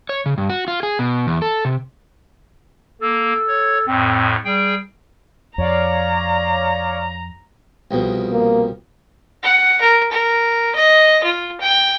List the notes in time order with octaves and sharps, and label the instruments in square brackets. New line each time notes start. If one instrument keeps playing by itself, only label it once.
[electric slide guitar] C#5
C#3
G2
F#4
F4
G#4
B2
E2
A4
C3
[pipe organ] A#3 [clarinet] A4
[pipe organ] C#5
[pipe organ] F2 A2 [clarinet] C4
[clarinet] G3 [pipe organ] G#4 G5
[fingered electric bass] F2 [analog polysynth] C#5 D5 F5 [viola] A#5
[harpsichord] C2 F2 B2
[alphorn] A#3
[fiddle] F#5
A#4
A#4
D#5
F4
G5